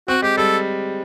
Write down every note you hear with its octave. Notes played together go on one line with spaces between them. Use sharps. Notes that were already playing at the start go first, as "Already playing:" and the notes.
C4 F#4
G#3 G4
G3 A4